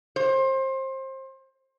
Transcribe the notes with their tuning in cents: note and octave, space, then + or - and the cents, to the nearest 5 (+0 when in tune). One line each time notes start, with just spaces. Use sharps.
C5 +25